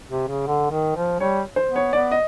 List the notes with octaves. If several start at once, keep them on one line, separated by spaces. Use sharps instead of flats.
C3
C#3
D3
D#3
F3
G3 C#5
C5
B3
C#5
B3 D5
D#5